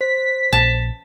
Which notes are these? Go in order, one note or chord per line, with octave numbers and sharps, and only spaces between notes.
C5 B6
A#1 A5